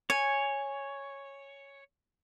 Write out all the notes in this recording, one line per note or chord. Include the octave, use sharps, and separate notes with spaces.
C#5 G#5